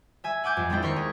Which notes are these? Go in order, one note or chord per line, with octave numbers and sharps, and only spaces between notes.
E5 G#5 E6
F#5 G#5 D6 G6
F2
G#3 C4 D4 E4 G5
D#2 A#4 C5 C#6 B6
G#4